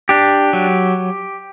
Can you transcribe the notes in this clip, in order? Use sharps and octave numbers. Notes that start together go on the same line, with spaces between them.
D4 G4
F#3